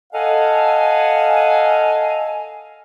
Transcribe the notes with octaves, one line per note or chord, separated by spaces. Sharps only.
A4 D#5 F5 F#5 G#5